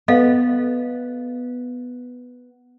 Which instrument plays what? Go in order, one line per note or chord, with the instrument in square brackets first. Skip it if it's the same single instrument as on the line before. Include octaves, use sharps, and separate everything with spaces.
[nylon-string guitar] B3 [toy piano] A4 D#5 F5